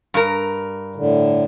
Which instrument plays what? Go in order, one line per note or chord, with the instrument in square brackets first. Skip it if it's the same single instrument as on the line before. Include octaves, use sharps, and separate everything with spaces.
[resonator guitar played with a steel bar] G2 A#4
[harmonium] A2 D3